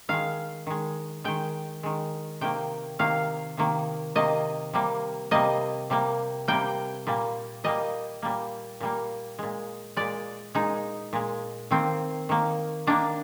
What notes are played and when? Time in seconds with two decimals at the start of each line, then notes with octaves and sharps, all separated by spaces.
0.09 D#3 G#3 F5
0.66 D#3 G#3
1.24 D#3 G#3 G5
1.83 D#3 G#3
2.41 C3 D#3 A#3 G5
2.99 C3 D#3 A#3 F5
3.57 C3 D#3 A#3
4.15 C3 D#3 A#3 D#5
4.73 C3 G3 A#3
5.31 C3 G3 A#3 D#5
5.90 C3 G3 A#3
6.48 C3 G3 A#3 G5
7.07 A#2 G3 A#3
7.64 A#2 G3 A#3 D#5
8.22 A#2 G3 A#3
8.80 A#2 G3 A#3
9.38 A#2 G#3
9.96 A#2 G#3 D5
10.55 A#2 G#3 D#4
11.13 A#2 G#3
11.71 D#3 A#3 C4
12.29 D#3 A#3
12.87 D#3 A#3 D4